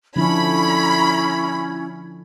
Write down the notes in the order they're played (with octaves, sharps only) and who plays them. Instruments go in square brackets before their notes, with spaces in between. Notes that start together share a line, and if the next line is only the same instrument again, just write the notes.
[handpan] D3 F3 D4 [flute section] C#4 E4 G#6 [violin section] B5